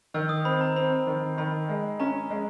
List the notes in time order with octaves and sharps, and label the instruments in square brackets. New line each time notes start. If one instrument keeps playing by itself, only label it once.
[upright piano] D#3 [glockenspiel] E6
[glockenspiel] D#6
[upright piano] C4 [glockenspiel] B5
[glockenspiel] A#5
[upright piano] C4 [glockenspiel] B5
[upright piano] D#3
[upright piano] D#3 [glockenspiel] B5
[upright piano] G#3
[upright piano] C#4 [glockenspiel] A#5
[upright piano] G#3